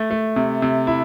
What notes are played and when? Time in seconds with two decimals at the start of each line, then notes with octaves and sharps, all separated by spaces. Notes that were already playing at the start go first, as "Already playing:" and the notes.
Already playing: A3
0.11 A3
0.36 C3
0.62 C3
0.87 E4